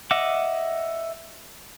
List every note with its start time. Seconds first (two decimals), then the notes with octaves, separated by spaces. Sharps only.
0.11 D#5 E5 F#5 D6